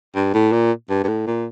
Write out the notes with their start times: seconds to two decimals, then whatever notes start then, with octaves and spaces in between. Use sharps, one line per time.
0.15 G2
0.34 A2
0.52 A#2
0.90 G2
1.04 G2
1.08 A2
1.26 A#2